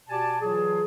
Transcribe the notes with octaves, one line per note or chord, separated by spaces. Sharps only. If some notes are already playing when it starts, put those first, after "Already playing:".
B2 G4 D5 G#5 A5
E3 F#3 F4 G#4